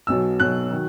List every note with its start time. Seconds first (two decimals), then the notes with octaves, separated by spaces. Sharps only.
0.07 B1 B2 F#3 E6
0.40 B1 B2 F#3 F#6
0.71 D#3 F#3